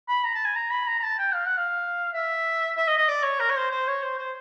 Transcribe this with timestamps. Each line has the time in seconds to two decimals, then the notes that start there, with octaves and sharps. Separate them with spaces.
0.08 B5
0.24 A#5
0.35 A5
0.45 G#5
0.56 A#5
0.71 B5
0.87 A#5
0.99 A#5
1.03 A5
1.19 G5
1.34 F5
1.46 F#5
1.57 F5
2.14 E5
2.77 E5
2.87 D#5
2.98 D#5
3.09 D5
3.24 C#5
3.40 A#4
3.50 C#5
3.56 C5
3.71 C5
3.87 C#5
4.03 C5
4.18 C5